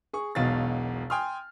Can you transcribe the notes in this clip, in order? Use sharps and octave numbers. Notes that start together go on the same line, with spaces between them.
G#4 C#6
E1 B1 B2 F5 A6
G5 G#5 C6 D#6 F6